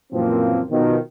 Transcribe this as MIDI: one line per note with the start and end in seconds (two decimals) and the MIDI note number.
0.13 0.61 42
0.13 0.61 46
0.13 0.61 52
0.13 0.61 53
0.13 0.61 58
0.13 0.61 60
0.71 0.97 47
0.71 0.97 51
0.71 0.97 53